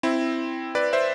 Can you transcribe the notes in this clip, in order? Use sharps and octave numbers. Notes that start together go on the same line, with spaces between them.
C4 E4
B4 D5
C5 E5